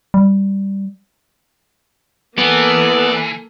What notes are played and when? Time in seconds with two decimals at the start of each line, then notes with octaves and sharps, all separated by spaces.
0.14 G3
2.38 E3 A#3 B3 A4 D5